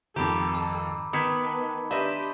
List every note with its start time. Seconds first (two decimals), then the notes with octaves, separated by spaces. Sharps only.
0.16 G#1 F2 D#3 G4 A4 A#5 B5 D6
0.55 E6
1.13 D#3 B3 B5 G#6 B6 C#7
1.46 A5
1.91 D4 G4 B4 D#5 E5 C6